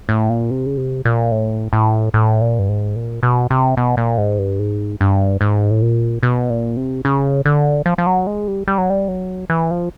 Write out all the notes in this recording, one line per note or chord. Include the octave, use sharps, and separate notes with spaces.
A2
A#2
C3
C#3
C3
A#2
A2
A2
A2
A#2
G2
G#2
A#2
B2
C3
B2
A#2
G#2
G2
G#2
G2
G#2
A2
A#2
B2
A#2
C3
C#3
D3
F3
F3
F#3
G#3
G3
G3
F#3
G3
F#3
E3
F3